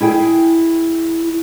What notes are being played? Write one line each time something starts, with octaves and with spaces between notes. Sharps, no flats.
E4 G#4 G5